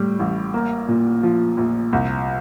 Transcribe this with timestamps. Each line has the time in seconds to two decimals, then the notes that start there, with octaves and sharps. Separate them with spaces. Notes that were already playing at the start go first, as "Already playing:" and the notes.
Already playing: A2 G3
0.19 A1
0.54 A#3
0.88 A#2
1.23 F3
1.57 A#1
1.93 C2